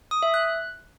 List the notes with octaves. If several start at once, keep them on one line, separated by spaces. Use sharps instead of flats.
D#6
E5
F#6